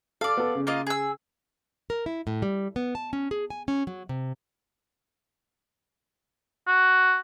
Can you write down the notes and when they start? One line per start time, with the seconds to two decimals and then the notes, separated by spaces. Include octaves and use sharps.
0.21 A4 D5 F5
0.37 B3 A4
0.55 C#3
0.67 A#3 F4 D#5
0.87 G#4 E6
1.90 A#4
2.06 E4
2.27 A2
2.42 G3
2.76 B3
2.95 A5
3.13 C#4
3.31 G#4
3.50 G#5
3.68 C#4
3.87 F#3
4.09 C3
6.67 F#4